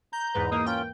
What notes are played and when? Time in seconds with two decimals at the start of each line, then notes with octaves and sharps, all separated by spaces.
0.13 A#5 G6
0.34 E2 G#2 B4
0.51 A#3 D#4 D#6
0.66 C#4 F4 G5